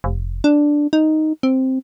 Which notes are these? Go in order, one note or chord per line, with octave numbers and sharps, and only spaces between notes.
F1
D4
D#4
C4